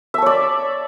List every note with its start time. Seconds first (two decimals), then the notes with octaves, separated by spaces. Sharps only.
0.14 E5
0.18 A5
0.22 C#5
0.26 D5